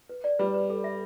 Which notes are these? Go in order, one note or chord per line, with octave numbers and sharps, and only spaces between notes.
B4
D5
G3 B4
B4
A4
E5